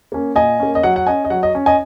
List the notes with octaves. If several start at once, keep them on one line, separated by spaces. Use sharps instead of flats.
A#3 C#4
A#2 D#5 G#5
A#3 C#4
D#5
F#3 F#5
F#5
C#4 D#5 G#5
D#5
F#3 F#5
D#5
C#4
D#5 G#5